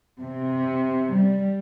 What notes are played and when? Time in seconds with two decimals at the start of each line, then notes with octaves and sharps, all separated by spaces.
0.21 C3
1.14 G3